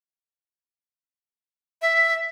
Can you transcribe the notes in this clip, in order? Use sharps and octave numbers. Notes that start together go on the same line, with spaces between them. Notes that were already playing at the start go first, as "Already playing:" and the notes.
E5